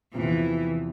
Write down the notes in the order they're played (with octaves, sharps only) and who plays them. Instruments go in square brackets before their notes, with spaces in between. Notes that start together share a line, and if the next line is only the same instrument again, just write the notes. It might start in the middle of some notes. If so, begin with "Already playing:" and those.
[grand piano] E2 C3 F3 [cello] E3